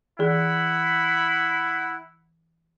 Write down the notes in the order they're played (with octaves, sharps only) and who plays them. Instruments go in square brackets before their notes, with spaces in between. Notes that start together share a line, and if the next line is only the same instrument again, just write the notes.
[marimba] E3 G#4 [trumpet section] E4 F#5 B5